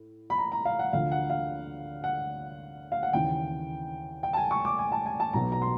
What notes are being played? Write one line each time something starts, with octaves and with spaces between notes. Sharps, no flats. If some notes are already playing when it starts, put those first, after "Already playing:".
Already playing: A2
B5
A#5
A#5
F5
F#5
D2 D3 F3 F5
F#5
F5
F#5
F5
F#5
D#2 C#3 E3 G5
G5
A5
G#5
C#6
D6
G#5
A5
G#5
A5
B1 B2 F#3 B3 A#5
A#5
C6